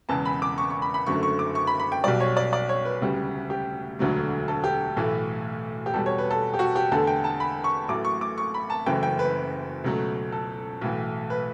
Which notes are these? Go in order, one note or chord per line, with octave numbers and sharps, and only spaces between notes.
E1 E2 C#3 E3 A5
B5
D6
C#6
C#6
B5
B5
F#1 F#2 D3 F#3 A3 C#6
C#6
D6
C#6
B5
B5
G5
B1 B2 G3 D5
C#5
D5
D5
C#5
B4
E1 D2 C#3 G3
G4
E1 D2 D3 F#3 A3
A4
G4
B1 A2 E3 A3
G4
E2 B2 G3 A4
C#5
B4
A4
G4
F#4
G4
E2 D3 A3 A4
G5
A5
B5
C#6
A1 A2 F#3 A3 D6
C#6
D6
C#6
B5
A5
F#1 F#2 C#3 E3 A3 G5
G5
B4
C#2 B2 F#3 A3
A4
B1 A2 E3
B4